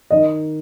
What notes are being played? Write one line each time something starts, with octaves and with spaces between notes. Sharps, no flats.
D#3 D#5